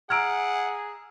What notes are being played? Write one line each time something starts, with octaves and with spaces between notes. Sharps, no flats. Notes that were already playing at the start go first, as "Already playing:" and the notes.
G#4 F#5 A#5 E6 F6 G#6 D7